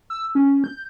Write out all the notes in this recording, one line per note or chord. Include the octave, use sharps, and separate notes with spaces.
E6
C#4
G6